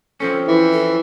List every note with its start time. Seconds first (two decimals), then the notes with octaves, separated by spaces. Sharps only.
0.20 F3 C4 C#4 A4
0.48 E3 E4
0.73 A4